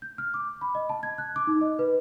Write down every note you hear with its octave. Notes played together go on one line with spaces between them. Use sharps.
G6
F6
D6
B5
D#5
A5
G#6
F#6
D6
D#4
D#5
B4